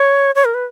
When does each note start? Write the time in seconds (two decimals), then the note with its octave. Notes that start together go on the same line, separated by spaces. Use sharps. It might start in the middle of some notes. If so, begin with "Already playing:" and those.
Already playing: C#5
0.35 C#5
0.45 A#4
0.54 B4